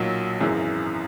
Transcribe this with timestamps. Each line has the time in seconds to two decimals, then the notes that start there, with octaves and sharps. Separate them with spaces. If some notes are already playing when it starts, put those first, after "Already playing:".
Already playing: B1 A#2 F#3
0.41 G#1 F#2 E3 G#4